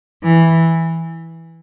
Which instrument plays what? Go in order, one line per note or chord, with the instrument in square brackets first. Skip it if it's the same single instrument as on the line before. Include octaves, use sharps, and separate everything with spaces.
[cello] E3